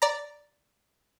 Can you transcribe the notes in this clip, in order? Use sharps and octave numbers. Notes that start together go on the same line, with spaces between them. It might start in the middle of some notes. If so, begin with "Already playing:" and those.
D5 A#5